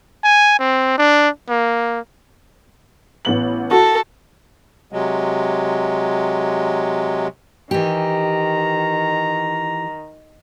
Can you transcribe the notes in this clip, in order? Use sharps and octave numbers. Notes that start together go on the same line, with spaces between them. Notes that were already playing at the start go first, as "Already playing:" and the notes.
G#5
C4
D4
A#3
A1 B3 F#7
F#4 A4
C3 F#3 G#3
D#3 E3 G4 A#5